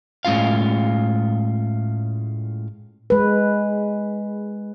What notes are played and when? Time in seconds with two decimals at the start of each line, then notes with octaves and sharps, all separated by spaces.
0.25 A2 G#3 C#4 F4 F5
3.10 G#3 B4